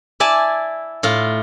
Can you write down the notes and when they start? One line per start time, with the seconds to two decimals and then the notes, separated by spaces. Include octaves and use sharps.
0.20 E4 D5 G#5 A5
1.03 A2 F4